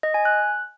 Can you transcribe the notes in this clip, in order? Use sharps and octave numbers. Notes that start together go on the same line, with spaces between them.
D#5
G#5
F#6